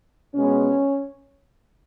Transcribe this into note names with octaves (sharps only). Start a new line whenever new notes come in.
B2 G#3 B3 C#4